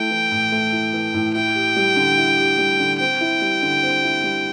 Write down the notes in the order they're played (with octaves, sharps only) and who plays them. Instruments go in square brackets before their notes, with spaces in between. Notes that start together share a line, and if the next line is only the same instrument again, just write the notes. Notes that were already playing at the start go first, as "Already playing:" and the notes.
Already playing: [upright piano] A3 E4 [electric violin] G5
[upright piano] E3
A2
A3
E4
E3
A2
[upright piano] E4 [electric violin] G5
[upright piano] G4
G3
D3
E4
G4
G3
D3
[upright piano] C4 [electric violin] G5
[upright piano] E4
G3
D3
C4
E4
G3